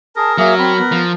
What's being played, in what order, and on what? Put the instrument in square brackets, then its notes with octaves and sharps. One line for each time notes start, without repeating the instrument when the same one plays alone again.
[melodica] G#4 [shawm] A#4 [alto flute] A5
[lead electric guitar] F#3 [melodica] A#3 G#4 [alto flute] E5
[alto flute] C4 [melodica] B5
[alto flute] B3
[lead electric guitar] F3